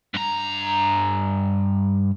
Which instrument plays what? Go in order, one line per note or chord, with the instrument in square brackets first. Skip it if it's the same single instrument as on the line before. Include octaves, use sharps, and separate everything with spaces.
[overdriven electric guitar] G2 A#5